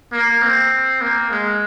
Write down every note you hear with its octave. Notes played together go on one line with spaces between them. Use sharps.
A#3
C4
A#3
G#3